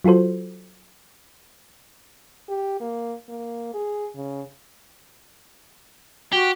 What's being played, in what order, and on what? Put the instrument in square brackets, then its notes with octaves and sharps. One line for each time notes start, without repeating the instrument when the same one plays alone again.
[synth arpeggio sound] F#3 F4 F#4 A4 C5
[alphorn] G4
A#3
A#3
G#4
C#3
[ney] F#4 [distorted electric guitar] G4